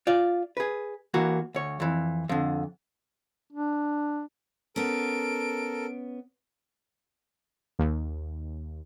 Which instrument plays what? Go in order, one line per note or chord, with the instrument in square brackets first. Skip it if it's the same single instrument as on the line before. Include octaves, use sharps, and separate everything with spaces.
[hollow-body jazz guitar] F4 D5
G#4 B4
E3 A#3 F#4
D2 C#5
F2 E3
F2 D3
[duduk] D4
[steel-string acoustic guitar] B3 C#4 [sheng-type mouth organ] A4 A#4 [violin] D7
[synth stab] D#2